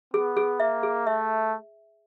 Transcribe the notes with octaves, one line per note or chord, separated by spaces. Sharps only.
B3 G#4
G#4
A#3 E5
G#4
A3 E5